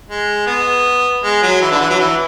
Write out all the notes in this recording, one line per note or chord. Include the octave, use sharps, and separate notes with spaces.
G#3
B3
G#3
F#3
E3
D3
E3
F#3
E3